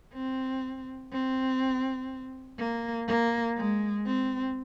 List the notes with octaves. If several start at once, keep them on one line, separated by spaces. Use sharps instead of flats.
C4
C4
A#3
A#3
G#3
C4